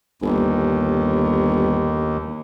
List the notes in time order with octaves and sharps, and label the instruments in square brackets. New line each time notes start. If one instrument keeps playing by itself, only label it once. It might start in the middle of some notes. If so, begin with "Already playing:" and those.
[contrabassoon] G1 [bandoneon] D#2